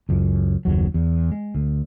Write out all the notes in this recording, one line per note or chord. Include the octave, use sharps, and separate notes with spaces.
C#2 F#2
F#1 D#2 F#3
E2
G#3
D2